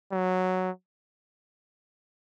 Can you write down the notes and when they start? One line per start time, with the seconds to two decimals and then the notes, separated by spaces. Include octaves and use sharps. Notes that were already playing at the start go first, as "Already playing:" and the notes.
0.12 F#3